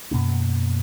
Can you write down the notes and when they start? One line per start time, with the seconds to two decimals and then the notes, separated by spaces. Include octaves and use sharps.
0.11 F#2 B2 A#3 C#4